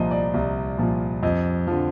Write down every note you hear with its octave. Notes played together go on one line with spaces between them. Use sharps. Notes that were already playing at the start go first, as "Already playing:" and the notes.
Already playing: C2 A#2 F3 D#5 A#5
D5
C2
A#2 F3
F2 D#5
D3 F3